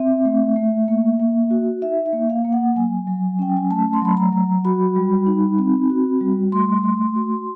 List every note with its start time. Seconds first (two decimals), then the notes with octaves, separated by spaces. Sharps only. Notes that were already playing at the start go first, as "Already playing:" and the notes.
Already playing: C4 E5
0.25 A3
0.56 A3
0.88 A#3
1.20 A#3
1.51 F#4
1.82 D#4 E5
2.06 E5
2.13 A#3
2.30 F5
2.45 A#3
2.52 F#5
2.76 F#3 G#5
3.07 F#3
3.39 C#4 G5
3.57 G#5
3.70 A3 A5
3.93 C6
4.02 F#3 B5
4.17 A#5
4.32 F#3
4.65 F#4 B5
4.96 G3
5.26 D#4
5.58 C4
5.90 F#4
6.21 G3
6.52 A3 C6
6.84 A3
7.16 F#4